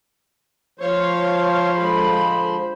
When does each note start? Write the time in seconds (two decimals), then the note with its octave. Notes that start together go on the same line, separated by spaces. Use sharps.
0.80 F3 C5 C#5 F5
1.77 D3 G#3 B5